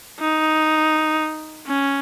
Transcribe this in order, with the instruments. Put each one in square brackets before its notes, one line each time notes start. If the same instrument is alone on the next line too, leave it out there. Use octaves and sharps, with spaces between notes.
[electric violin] D#4
C#4